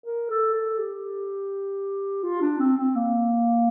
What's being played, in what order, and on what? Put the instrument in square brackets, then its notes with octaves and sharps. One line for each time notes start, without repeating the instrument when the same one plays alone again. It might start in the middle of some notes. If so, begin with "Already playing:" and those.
[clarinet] A#4
A4
A4
G4
F4
D4
C4
C4
A#3